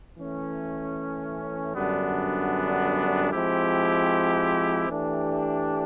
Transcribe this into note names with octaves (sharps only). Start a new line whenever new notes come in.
E3 A3 C#4
F#2 D3 G3 B3 D4
F3 G#3 C4 E4 G4
E3 A3 D4 G4